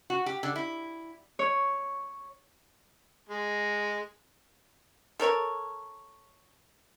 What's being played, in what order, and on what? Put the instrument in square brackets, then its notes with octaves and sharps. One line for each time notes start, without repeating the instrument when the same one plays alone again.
[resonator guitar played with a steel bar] F#4
G4
D3
E4
[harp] C#5
[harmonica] G#3
[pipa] A4 A#4 C#5